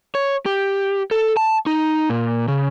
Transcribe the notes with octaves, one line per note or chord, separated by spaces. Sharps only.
C#5
G4
A4
A5
D#4
A#2
C#3